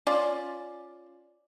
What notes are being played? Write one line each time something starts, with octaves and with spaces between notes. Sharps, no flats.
C#4 F4 D5